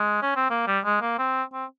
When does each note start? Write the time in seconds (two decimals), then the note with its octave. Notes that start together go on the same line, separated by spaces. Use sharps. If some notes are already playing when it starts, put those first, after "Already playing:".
Already playing: G#3
0.23 C#4
0.36 C4
0.50 A#3
0.67 G3
0.85 G#3
1.02 A#3
1.19 C4
1.53 C4